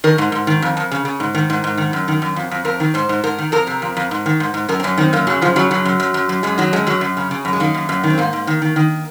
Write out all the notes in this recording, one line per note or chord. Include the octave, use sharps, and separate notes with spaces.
D#3 A#4
G#2
G#2
D#3
F2
F2
C#3
C#3
G#2
D#3
G#2
G#2
D#3
F#2
D#3
F#2
F2
F2
F2 A#4
D#3
G#2 C5
G#2
G#2 A#4
D#3
F2 A#4
C3
F2
F2
G#2
D#3
G#2
G#2
F#2 A#4
C4
F#2 C#4
D#3 C4
F#2 A#3
C#3 F#3
F#2 F3
C#3 F#3
F#2 F#3
F#2
F#2
F#2
F#2
F#2 G#3
D#3 F#3
F#2 G#3
F#2 F#3
F#2
C#3
C#3
F#2
G#3
D#3 A#3
F#2
F#2
D#3
C4
G#2 A#3
G#2
D#3
D#3
D#3